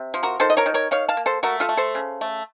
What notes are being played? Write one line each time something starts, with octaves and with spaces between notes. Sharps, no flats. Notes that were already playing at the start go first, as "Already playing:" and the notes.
Already playing: C3
F3
F#4 A#4
D#3 A4 C5
D#5
A#4 C#5
D#3
A#4 C#5
D#3 C#5 F5
F5 A5
A#3
A4 C5
A3 F#4 A#4
F4 A4
A3
A4 C5
C#3
A3